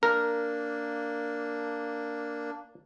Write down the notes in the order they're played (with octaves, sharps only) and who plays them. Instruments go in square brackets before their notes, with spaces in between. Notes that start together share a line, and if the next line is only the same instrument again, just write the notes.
[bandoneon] A#3 D4 [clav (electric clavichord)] A#4